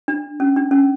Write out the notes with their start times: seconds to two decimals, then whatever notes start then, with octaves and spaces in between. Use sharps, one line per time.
0.08 D4
0.40 C#4
0.56 D4
0.71 C#4